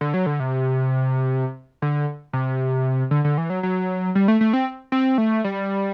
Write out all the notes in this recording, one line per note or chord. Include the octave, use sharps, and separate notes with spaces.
D3
F#3
D3
C3
D3
C3
D3
D3
E3
F#3
F#3
G3
A3
A3
C4
C4
A3
G3